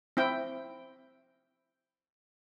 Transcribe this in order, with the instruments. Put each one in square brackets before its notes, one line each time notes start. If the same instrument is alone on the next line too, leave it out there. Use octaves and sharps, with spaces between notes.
[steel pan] C4 E4 G5